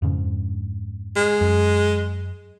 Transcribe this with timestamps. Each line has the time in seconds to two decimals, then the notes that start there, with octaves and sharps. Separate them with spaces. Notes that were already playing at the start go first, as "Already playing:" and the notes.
0.02 F2 G#2 C#3
1.16 G#3
1.41 F#2